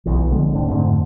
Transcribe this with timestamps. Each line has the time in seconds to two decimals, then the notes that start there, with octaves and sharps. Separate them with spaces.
0.06 B1 E3
0.31 D3 F3 G#3 B3
0.55 D2 A2 C4 D4
0.68 F2 G#2 D3 A3